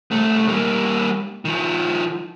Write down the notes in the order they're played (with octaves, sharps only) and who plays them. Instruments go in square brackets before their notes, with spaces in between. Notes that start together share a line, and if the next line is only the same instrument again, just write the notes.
[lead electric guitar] C2 A3
G3 A#3
D#3 F3